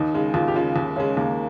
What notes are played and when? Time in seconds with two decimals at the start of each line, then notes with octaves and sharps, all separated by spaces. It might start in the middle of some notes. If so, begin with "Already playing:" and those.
Already playing: D#2 D#4
0.14 C#3 G#3
0.34 D#2 F4
0.48 G4
0.54 C#3 G#3 F4
0.76 D#2
0.96 C#3 G#3 C#4
1.17 D#2 A#3